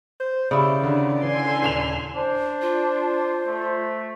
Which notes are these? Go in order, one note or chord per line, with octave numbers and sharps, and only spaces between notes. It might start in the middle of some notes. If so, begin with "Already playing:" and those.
C5
C#3 E4 G4 D5
D3 D#3
D3 E3 G#5 C6
D#1 E7 F7
D4 C5
F4
A3